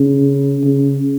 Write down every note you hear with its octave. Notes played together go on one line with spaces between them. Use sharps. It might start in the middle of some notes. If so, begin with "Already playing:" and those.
Already playing: C#3
C#3